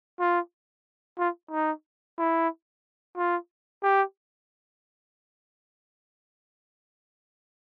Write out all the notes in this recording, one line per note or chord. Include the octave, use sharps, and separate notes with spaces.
F4
F4
D#4
E4
F4
G4